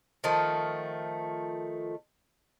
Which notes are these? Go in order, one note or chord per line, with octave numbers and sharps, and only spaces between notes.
D#3 F3 A3